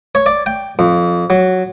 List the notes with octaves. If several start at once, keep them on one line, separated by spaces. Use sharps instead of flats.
C#5
D5
G5
F2
F#3